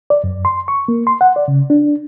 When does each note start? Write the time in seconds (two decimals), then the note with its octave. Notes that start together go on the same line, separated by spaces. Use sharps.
0.10 D5
0.24 F#2
0.45 C6
0.68 C#6
0.88 A#3
1.07 C6
1.21 F#5
1.36 D5
1.48 C#3
1.70 D4